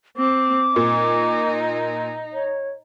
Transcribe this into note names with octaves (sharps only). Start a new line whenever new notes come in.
C4 D6
A#2 D#4
C#5